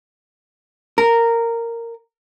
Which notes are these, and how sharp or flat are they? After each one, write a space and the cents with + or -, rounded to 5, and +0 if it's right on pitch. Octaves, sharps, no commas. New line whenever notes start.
A#4 -10